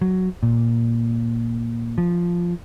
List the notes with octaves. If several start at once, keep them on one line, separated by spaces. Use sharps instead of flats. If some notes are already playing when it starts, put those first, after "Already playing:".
F#3
A#2
F3